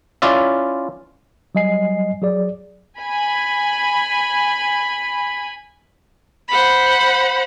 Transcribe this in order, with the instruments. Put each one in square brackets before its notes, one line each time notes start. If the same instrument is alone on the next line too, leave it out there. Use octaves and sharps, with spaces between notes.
[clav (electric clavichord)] C#4 E4 F4 D5 E5
[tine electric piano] F#3 G3 D#5 G#5 C7
F#3 G#4 D5
[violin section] G#5 B5
[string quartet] C5 F#5 B5